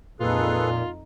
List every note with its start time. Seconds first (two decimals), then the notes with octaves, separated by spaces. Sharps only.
0.20 F2 A#2 D#4 F4 G#4 A4 B4